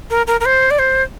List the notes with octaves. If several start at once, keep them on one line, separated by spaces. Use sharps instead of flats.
A#4
A#4
A#4
C5
D5
C5